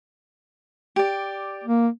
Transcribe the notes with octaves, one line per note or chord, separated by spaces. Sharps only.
G4 D5
A#3